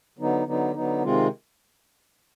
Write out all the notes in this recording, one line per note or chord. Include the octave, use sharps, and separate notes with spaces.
D3 F#3 B3 D#4
D3 F#3 B3 D#4
D3 F#3 B3 D#4
C3 D#3 G#3 C4 F4